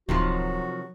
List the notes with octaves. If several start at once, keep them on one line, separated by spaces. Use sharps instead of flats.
D1 C3 D#3 F3 F#3 F#4